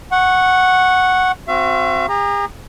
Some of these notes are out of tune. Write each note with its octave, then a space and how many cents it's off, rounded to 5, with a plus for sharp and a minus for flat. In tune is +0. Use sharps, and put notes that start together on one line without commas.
F#5 +0 C#6 -15
C4 +0 F#4 -15 E5 +45
G#4 -45 A#5 +0